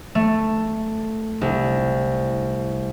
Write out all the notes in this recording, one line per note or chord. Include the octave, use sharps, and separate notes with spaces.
A3
C2